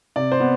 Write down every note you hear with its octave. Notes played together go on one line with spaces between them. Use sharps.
C3 D5
C5
B3